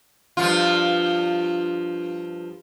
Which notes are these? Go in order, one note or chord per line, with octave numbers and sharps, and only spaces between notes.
G2 F3 F4